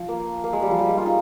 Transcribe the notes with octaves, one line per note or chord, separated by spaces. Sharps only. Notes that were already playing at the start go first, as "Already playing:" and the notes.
Already playing: F3
A#3
A#3
G#3
G3
F3
G3
G#3
F4
D#4